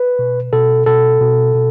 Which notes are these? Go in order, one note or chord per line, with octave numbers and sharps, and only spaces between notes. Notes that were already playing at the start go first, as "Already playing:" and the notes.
Already playing: B4
B2
B2 A4
B2 A4
B2
B2